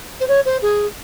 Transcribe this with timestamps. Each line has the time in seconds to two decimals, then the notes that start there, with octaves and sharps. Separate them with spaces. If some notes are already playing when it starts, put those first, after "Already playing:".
0.20 C5
0.28 C#5
0.45 C5
0.62 G#4